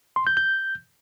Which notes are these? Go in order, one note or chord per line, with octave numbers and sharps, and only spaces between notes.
C6
G6
G6